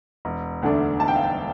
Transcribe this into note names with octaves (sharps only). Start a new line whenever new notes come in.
E1
D2 D3 A3 D4
E1 A5
G5
F5
G5